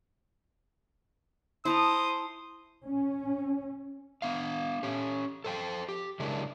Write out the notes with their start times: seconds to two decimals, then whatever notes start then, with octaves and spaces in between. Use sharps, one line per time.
1.65 E4 C5 A5 A#5 D#6
2.84 C#4
4.22 B3 D4 F5
4.83 C#4 G4 C#5
5.44 A4 C5 G5
5.89 G4
6.20 C#3 F#3 G#3 D4 E4 A#4